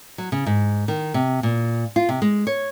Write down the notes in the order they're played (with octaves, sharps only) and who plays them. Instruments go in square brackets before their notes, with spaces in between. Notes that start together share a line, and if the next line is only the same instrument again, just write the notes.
[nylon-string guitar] F#3
C#3
G#2
D#3
C3
A#2
F4
C3
G#3
C#5